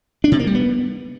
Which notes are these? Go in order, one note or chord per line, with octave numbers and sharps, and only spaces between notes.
D4
C3
A#3
G3
B3